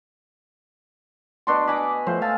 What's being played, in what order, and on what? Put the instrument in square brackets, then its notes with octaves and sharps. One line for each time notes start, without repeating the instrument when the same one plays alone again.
[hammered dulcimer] B2 D4 C#6 [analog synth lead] C6
[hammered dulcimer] D#5 G#5 B5 [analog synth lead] D6
[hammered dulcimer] A2 C5 [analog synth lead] F3
[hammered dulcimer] F5 G#5 A5 [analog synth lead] E6